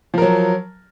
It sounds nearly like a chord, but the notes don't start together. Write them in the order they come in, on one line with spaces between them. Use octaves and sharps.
F3 A#4 F#3